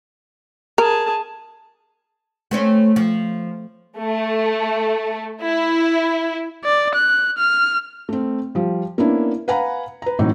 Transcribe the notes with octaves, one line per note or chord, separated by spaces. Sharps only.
G#4 A#4 A5
A3 C4 C#4
F3
A3
E4
D5
F#6
F6
A3 C4
F3 G3
A#3 B3 C#4 D4 E4
B4 F5 F#5 G#5 A#5 B5
B4 A#5
A2 E3 F#3 C4 D#4 F#4